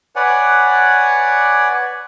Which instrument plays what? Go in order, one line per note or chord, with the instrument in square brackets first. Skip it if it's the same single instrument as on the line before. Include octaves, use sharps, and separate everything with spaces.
[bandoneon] B4 C#5 D5 F#5 G#5